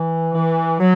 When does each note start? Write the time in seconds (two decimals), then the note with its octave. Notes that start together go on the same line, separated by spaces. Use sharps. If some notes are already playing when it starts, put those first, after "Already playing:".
Already playing: E3
0.34 E3
0.79 F#3